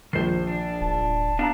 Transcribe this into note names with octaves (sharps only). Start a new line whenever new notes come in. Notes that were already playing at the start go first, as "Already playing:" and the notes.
A#1 D#3 C5 C7
D4
D1 A5
B3 D4 F5 A5 A#5